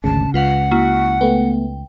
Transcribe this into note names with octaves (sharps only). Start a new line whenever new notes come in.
G#1 D2 C#3 A5
C#2 F4 B4 F5 F#5
A#3 E4 F#4 C#6
A3 B3 G5